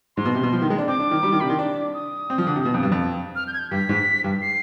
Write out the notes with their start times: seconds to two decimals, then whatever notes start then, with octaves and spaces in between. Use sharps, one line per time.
0.17 G#2 C6
0.25 B2
0.35 C3
0.43 B2
0.52 F3
0.62 D#3
0.70 G#3
0.78 D4
0.88 C4 D6
1.00 D4
1.11 D#3
1.23 G3
1.32 D#3
1.40 C3 B5
1.49 D#3 C6
1.59 D4 D6
1.94 D#6
2.30 C4
2.38 F3
2.47 D3
2.56 C3
2.65 B2
2.74 F2
2.83 G2
2.92 F2
3.36 F6
3.47 G6
3.54 G#6
3.59 G6
3.71 G2 B6
3.89 G#2
4.24 G2
4.42 C7